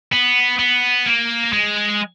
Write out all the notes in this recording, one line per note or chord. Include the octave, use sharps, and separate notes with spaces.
B3
B3
A#3
G#3